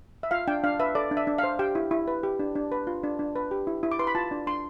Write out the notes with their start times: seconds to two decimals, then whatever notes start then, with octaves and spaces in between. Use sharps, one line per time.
0.23 E5
0.31 F4 F5
0.48 D4 G5
0.63 D4 F5
0.79 B4 E5
0.95 A4 D5
1.11 D4
1.17 E5
1.27 D4
1.38 F5
1.44 C5
1.59 G4 G5
1.75 E4
1.91 E4
2.07 B4
2.23 G4
2.39 D4
2.56 D4
2.72 B4
2.87 F4
3.04 D4
3.19 D4
3.36 B4
3.51 G4
3.67 E4
3.83 E4
3.92 D6
3.99 B4 C6
4.07 B5
4.15 F4 A5
4.31 D4
4.47 D4 C6